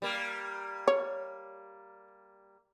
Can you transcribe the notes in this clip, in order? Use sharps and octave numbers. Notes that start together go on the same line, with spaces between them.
G3 A#3
C#5